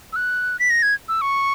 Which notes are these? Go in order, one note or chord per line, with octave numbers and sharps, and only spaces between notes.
E6
F#6
B6
A#6
G#6
E6
C#6